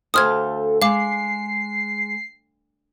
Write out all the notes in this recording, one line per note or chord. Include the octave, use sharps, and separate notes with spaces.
D2 A4 C5 F5 D#6 F6 G#6
G#3 F5 D6 C7